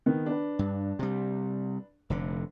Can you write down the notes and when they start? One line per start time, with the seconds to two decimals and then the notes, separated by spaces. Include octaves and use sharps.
0.06 D#3 B3
0.26 D4 B4
0.59 G2
0.99 C3 G3
2.10 F1 D3